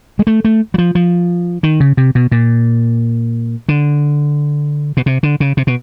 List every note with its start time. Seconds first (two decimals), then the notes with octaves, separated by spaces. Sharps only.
0.19 G#3
0.27 A3
0.45 A3
0.74 F#3
0.78 F3
0.95 F3
1.63 D#3
1.80 C#3
1.97 C3
2.15 B2
2.32 A#2
3.69 D3
4.97 B2
5.06 C3
5.23 D3
5.40 C#3
5.57 C3
5.67 B2